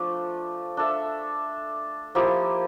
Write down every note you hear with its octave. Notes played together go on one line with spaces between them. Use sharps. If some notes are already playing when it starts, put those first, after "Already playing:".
Already playing: F3 A3 D4
D4 A4 E5
F3 A#3 E4 G4